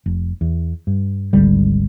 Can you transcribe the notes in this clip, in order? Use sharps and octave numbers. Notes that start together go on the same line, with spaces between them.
F1
E2
G2
G#1 D2 D3 G3